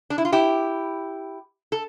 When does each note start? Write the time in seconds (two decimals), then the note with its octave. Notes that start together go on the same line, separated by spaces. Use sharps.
0.10 D4
0.18 E4
0.25 F4
0.32 E4 G4
1.72 A4